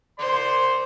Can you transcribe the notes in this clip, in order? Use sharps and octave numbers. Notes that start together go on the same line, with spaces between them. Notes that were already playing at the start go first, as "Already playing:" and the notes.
C5 D5 C6